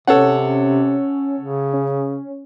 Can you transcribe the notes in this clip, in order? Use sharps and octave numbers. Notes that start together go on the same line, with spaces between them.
C3 C#4 A4 C#5 F#5
C#3
C#4